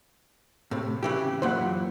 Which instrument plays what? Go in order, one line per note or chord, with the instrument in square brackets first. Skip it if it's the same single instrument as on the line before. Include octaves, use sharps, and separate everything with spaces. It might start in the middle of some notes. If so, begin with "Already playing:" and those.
[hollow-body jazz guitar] A2 C3
C#3 E3 G4
[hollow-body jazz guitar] F#2 A#2 E3 [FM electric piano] C5 F#5